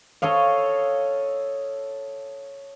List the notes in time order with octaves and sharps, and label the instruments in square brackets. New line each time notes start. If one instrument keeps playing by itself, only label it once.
[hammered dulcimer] A4 C#5 D#5 F5